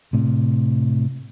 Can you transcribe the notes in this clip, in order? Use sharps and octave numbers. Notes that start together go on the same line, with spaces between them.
A2 C3